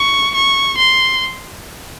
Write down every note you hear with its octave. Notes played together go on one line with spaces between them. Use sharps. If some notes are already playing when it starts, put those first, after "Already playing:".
Already playing: C#6
C#6
C6